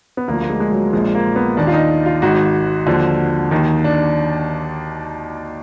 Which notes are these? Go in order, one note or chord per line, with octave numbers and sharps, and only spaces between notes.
B3
D2 D3 F3 A#3
A#3
G#3
G#3
F#3
A#1 A#2 F3 G#3
A#3
B3
D#2 D#3 D4
F4
D#4
F4
G#1 G#2 D#3 F#4
D#2 D3 F3
D#2 D#3
D4